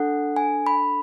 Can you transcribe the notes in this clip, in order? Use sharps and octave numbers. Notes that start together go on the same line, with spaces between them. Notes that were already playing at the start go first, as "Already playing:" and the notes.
Already playing: D4 A4 F#5
G#5
B5